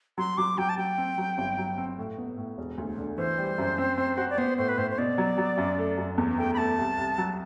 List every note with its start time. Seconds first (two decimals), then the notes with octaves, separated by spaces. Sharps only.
0.18 F#3 C6
0.38 F#3 D6
0.58 F#3 G5
0.69 A5
0.78 F#3 G5
0.98 C4
1.18 F#3
1.38 G1
1.58 F#3
1.78 C4
1.98 A2
2.18 B3
2.38 A2
2.58 E1
2.78 D2
2.98 D3
3.17 E3 C5
3.38 G3
3.58 F#2
3.78 C4
3.98 C4
4.17 F#4
4.30 D5
4.38 B3 C5
4.58 A2 C5
4.69 B4
4.78 A2 C5
4.91 C5
4.98 B2 D5
5.18 F#3
5.38 F#3
5.57 F#2
5.78 A3
5.97 F#2
6.18 E2
6.38 A3 G5
6.54 B5
6.58 A3 A5
6.78 C2
6.98 C2
7.18 F#3